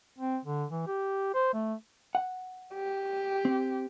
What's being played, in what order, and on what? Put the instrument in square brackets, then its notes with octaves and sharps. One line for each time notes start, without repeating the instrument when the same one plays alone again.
[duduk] C4
D3
E3
G4
C5
A3
[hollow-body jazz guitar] F#5
[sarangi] G4
[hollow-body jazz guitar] C4